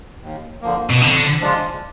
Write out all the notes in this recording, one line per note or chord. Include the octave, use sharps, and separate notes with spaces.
D#2
D3 F3 A#3
B2
F2 D3
F3 G#3 D4 F4